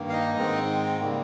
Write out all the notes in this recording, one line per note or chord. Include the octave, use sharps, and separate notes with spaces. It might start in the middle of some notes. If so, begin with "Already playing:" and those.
Already playing: G2 D#3 A#3
F5
D#4 D#5
G#2 D#3 G#3 C4
C#3 G3 A#3